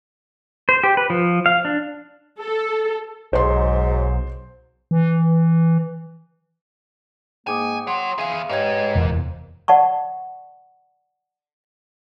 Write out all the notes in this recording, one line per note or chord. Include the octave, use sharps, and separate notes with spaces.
C5
G4
B4
F3
F5
D4
A4
B1 G#2 F#3 C5 C6
E3
G#2 A#3 G5 G#5 D6 D#6
C#5 F#5 C6
E3 G#4 E5 F5
G#2 G4 B4 C#5 D#5 G#6
F1 E2 A#2
D5 F#5 A5 C#6